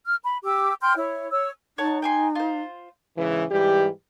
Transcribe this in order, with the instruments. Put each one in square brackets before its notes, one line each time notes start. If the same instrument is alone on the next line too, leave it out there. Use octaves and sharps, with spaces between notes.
[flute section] F6
B5
G4 D6 E6
G5 C6 F6 G6
E4 C#5
C#5 E6
[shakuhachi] D#4 [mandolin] C#5 F#5 A5
[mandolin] G5 G#5 C6
F4 C5
[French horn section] G#2 C#3 E3
G#2 E3 G3 G4